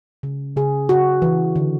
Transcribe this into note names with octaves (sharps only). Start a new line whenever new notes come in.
C#3
C#3 G#4
C#3 F#4
E3
D3